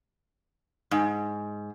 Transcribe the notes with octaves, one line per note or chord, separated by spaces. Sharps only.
G#2